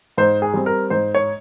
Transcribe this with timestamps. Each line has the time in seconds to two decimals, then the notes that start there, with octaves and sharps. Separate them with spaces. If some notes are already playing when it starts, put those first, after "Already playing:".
0.18 G#2 C5
0.42 G#4
0.54 G3 C4
0.66 A#4
0.90 G#2 C5
1.15 C#5